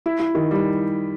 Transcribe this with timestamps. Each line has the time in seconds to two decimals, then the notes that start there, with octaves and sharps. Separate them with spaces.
0.06 E4
0.20 E4
0.35 D#3
0.51 G3